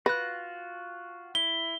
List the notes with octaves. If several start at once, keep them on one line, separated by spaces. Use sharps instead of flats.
F4 F#4 B4 F#6 A#6
E4 G7